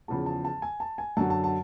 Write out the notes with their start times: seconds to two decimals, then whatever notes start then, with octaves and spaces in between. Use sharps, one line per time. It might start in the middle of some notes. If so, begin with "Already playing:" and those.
0.08 E2 C#3 F3 A5
0.26 A5
0.45 A5
0.62 G#5
0.80 A5
0.98 G#5
1.17 F#2 D3 F#3 A5
1.30 A5
1.44 A5